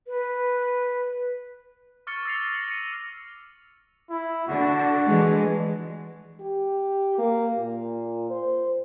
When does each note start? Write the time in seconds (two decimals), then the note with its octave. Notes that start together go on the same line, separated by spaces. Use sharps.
0.08 B4
2.07 C#6 D6 F6 A6 C#7 G7
2.25 E6 A6 A#6 C7 C#7 F7
2.54 A#6 C7 C#7 F#7
2.68 A#6 C#7 D#7
4.10 E4
4.48 D3 D4 F#4
5.06 E3 G#3
6.40 G4
7.19 A#3
7.58 A#2
8.30 C5